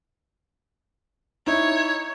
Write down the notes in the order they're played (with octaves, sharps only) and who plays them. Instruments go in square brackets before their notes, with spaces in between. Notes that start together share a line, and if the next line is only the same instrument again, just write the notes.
[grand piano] D#4 E4 [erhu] C#5